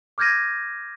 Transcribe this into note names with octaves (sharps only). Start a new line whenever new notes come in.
D6 F6 G6 G#6 A#6 D#7